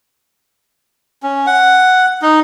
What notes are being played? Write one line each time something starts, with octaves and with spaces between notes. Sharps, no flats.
C#4
F#5
D#4